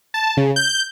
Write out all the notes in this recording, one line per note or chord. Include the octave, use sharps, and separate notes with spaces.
A5
C#3
G6